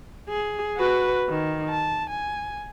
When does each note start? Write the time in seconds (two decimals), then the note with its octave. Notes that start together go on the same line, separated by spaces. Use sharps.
0.29 G#4
0.77 F#4 B4
1.30 D#3
1.69 A5
2.10 G#5